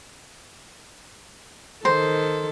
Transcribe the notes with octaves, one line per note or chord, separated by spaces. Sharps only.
D#3 A4 C5